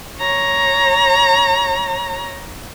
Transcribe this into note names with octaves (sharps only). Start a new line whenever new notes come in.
C#5 A#5